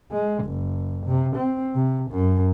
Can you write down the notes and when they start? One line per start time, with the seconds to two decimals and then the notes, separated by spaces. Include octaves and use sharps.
0.12 G#3
0.44 F#1
1.06 C3
1.36 C4
1.75 C3
2.11 F#2